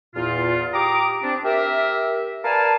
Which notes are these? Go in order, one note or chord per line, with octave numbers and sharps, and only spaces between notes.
E2 A#2 F4
G4 A#5 D6 D#6
C4 D4
G4 A#4 E5
A#4 B4 D5 F5 G#5 A5